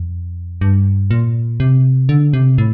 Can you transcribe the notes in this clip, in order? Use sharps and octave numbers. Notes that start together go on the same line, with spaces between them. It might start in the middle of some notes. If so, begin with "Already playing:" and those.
Already playing: F2
G2
A#2
C3
D3
C3
A2